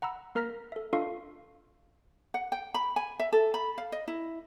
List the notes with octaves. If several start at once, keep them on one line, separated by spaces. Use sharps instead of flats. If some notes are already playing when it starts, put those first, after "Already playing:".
F#5 A#5 B5 E6
A#3 A#4 A#5 F6 A#6 B6
A4 E5
D4 F4 A4 D#5 F5 C#6
F#5
G5
B5
G#5
E5
A4
B5
F5
D#5
E4